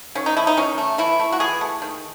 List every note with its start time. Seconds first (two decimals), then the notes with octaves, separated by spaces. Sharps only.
0.15 D#3 C#4
0.26 D#4
0.37 A3 E4
0.47 D#4
0.57 D#3 C#4
0.78 A3
0.98 E3 E4
1.20 A3
1.32 F#4
1.40 E3 G#4
1.61 A3
1.82 D#3